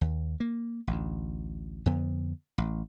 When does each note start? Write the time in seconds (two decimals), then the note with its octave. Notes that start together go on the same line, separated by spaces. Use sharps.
0.01 D#2
0.40 A#3
0.87 A1 D2
1.86 F2 D3 B3
2.58 A1